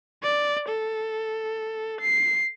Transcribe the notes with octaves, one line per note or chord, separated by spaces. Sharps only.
D5
A4
C7